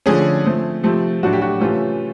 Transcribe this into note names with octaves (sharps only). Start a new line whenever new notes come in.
D3 F3 A3 C#4 G#4
F3 A3 C4
C3 F3 A3 C4
A2 F#3 A3 D4 F#4
G4
F#4
C3 E3 A3 C#4 F4